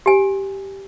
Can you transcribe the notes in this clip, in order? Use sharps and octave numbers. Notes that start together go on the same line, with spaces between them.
G4 G#5